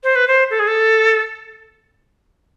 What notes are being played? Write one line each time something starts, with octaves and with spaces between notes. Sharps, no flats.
C5
B4
C5
A4
G#4
A4